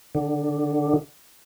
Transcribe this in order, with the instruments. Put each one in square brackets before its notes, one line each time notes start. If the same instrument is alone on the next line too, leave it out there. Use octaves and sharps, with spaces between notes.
[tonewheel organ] D3